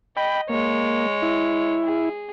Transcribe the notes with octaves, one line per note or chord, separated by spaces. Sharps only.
D#5 G5 B5
G#3 A#3 C#5
E4
G#4